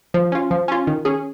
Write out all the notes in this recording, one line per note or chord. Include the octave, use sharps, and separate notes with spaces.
F3
C#4 F4
F3
C#4 F4
D#3
C#4 G#4